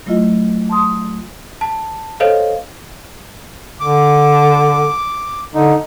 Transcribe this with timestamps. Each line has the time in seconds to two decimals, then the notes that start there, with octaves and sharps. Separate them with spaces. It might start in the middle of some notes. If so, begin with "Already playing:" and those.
0.06 F#3 A3 E4 F4 D#5
0.69 A5 C6 D#6
1.61 A5
2.20 A4 C5 C#5 D#5 F5
3.80 D3 D6
5.54 D3 D#4